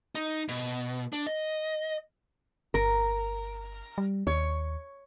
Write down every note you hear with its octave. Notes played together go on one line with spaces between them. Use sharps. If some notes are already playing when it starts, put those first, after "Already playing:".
D#4
B2
D4
D#5
G1 A#4
G3
D#2 C#5